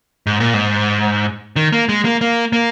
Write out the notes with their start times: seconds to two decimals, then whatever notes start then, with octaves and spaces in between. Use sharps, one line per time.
0.27 G#2
0.40 A#2
0.54 G#2
1.56 D#3
1.72 A#3
1.89 G#3
2.05 A#3
2.21 A#3
2.53 A#3